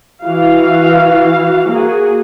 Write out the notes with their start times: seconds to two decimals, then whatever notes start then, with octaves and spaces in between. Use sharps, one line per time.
0.23 E3 F#4 F5
1.69 A#3 F#4 G#4